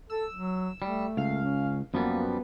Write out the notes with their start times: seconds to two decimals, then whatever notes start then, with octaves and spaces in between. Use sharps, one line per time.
0.10 A4 E6
0.33 F#3
0.82 G3 A3
1.17 C#2 F5
1.44 C#4
1.94 F#2 F3 G3 A#3 B3